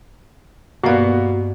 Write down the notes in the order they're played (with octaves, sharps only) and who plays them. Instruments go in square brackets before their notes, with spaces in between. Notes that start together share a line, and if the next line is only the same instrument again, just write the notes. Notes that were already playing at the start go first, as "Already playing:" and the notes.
[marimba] G2 D5 [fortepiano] B2 A#3 B3 [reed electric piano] F#4